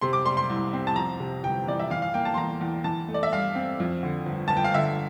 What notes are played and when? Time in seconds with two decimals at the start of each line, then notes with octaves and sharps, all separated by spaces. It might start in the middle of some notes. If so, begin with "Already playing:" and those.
0.01 C3 C6
0.13 D6
0.26 G3 C6
0.37 C6
0.50 C2
0.73 C4
0.87 A5
0.96 F2 A#5
1.20 C3
1.43 G1 G5
1.67 E3 D5
1.79 E5
1.90 E3 F5
2.02 F5
2.14 A#3 G5
2.25 A5
2.34 C6
2.37 E2 A#5
2.61 E2
2.84 E3 A5
3.09 A3
3.14 D5
3.23 E5
3.32 G2 F5
3.55 C4
3.80 F2
4.03 D3
4.26 G1
4.48 G1 A5
4.57 G5
4.64 F5
4.74 D3 E5